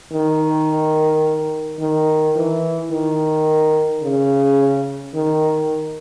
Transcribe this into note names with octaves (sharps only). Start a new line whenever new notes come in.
D#3
D#3
E3
D#3
C#3
D#3